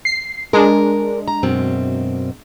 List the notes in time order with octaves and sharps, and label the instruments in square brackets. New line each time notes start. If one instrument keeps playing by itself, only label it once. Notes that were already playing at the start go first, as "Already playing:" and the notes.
[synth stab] C7
[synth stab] G#3 D4 [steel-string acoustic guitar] A#4
[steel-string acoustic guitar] A#5
F#2 B2 C4